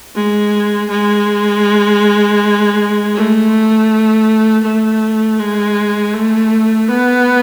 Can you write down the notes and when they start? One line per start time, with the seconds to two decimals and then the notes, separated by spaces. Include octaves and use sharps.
0.15 G#3
0.90 G#3
3.14 A3
4.63 A3
5.39 G#3
6.13 A3
6.88 B3